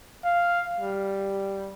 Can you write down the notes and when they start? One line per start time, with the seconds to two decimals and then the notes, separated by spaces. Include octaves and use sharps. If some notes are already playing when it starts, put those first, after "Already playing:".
0.24 F5
0.80 G3